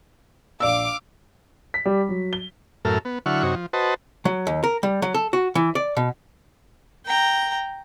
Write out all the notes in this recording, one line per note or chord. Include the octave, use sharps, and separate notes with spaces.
A#1 D5 F5 D6 E6
B6
G3
F#3
G7
F#2 A2 A4 A#4 F6
B3
D3 F#3 E4 F#5 C#6 F6
F#2 C3 D#4 F#4 C#5
F3
F#4 B4 C5 D#5 A5
F#3
D#2
A#4
G3
F#3
A4
F#4
E3
D5
B2
G5 A#5